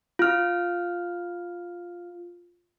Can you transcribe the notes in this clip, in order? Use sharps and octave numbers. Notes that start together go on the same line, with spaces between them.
F4 F6